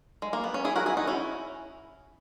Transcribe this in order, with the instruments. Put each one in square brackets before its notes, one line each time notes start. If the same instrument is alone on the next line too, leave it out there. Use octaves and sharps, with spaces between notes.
[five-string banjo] G#3
A#3
B3
C#4
E4 G#4
F#4 A#4
E4 G#4
D#4 F#4
C#4 E4